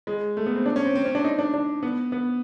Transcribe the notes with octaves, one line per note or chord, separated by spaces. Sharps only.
G#3
A3
B3
C4
D4
C#4
C4
C4
C#4
D4
D#4
D4
D4
B3
B3